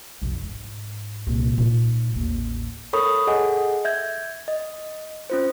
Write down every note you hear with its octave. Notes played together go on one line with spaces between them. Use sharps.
B1 F2
G#2
C2 A#2
A#2 D#4
A1 D#2
A4 A#4 C#5 B5 C#6 D#6
G#4 A4 D#5 F#5 G#5
E5 G6 G#6
D#5
C#4 F4 C5